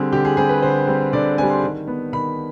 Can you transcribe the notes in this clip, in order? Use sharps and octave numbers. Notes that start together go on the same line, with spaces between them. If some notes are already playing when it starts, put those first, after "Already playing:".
Already playing: D3 G3 C4 G#4
D3 G4
G#4
G3 C4 G#4
B4
D3 C5
G3 C4
D3 D5
C4 G#5
G3
C6
D#3
B3
D#3 B5